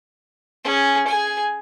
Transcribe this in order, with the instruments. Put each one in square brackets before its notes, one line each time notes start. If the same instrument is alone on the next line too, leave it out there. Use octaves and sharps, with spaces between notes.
[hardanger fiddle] C#4 G#4
G#4 G#5